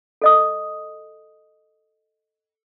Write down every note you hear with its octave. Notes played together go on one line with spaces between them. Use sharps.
A4 D#5 D#6